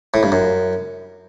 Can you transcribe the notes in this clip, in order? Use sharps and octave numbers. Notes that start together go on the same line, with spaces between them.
A2
G2
F#2